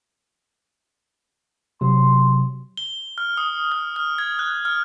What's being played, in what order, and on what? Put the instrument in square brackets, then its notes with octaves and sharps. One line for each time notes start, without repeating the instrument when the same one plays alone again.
[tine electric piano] C3 F#3 [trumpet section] C6
[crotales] G7
F6
D#6
F6
F6
G#6
F#6
F6